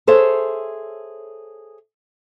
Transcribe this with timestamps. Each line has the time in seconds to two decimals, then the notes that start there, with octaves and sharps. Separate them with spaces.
0.07 G#4 A4 C5 C#5 E5